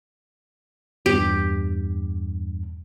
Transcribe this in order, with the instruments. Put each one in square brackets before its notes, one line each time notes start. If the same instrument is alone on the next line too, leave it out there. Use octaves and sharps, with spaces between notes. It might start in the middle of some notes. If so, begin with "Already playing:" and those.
[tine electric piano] E2 G2 [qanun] G4